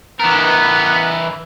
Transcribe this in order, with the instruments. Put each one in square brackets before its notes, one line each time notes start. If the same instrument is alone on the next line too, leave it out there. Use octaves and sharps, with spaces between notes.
[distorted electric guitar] E3 A#4 [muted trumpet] B3